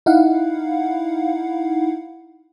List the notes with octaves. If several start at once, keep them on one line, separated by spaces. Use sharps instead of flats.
D#4 E4 F5 F#5